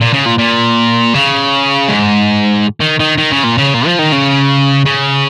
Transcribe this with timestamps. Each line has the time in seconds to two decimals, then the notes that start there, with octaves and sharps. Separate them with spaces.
0.01 A#2
0.14 C#3
0.26 A#2
0.39 A#2
1.14 C#3
1.88 G#2
2.81 D#3
3.00 D#3
3.18 D#3
3.31 C#3
3.44 A#2
3.58 C#3
3.74 A#2
3.86 F3
3.99 D#3
4.12 C#3
4.85 C#3